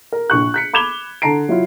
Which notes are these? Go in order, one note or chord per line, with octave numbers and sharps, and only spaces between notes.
A#4
A#1 C#6 F#6
F#6 B6 C#7
B5 D6 G#6 E7 F7 G7
D3 A5 A#5 C7 D7
F#3 E4 F4